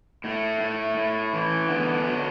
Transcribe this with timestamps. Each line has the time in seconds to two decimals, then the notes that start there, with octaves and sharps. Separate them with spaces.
0.24 A2 A3
0.60 A2
0.97 A2
1.33 E3
1.68 D3 B3
1.93 B3
2.05 F#3